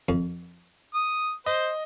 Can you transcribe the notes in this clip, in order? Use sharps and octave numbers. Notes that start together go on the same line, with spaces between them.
F2
D#6
C5 D#5